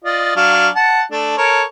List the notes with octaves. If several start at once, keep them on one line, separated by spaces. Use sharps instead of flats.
F4 D5 D#5
F#3 D4 F5
F#5 A5
A3 D4
A4 A#4 C#5